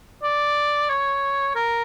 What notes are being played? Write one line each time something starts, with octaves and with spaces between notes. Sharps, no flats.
D5
C#5
A#4